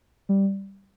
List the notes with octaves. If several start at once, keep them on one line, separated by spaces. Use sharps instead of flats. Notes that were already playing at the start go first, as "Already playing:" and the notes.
G3